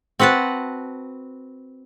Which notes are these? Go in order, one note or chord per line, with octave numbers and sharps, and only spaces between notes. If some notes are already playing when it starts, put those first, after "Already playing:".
C4 F#4 B4 F#5 A5